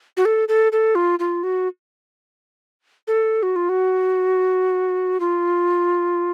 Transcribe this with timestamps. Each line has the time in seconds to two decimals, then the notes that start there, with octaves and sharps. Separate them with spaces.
0.17 F#4
0.25 A4
0.49 A4
0.72 A4
0.95 F4
1.19 F4
1.43 F#4
3.08 A4
3.43 F#4
3.56 F4
3.69 F#4
5.20 F4